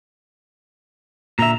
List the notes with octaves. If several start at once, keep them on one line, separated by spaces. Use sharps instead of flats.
A#2 D3 E5 A#5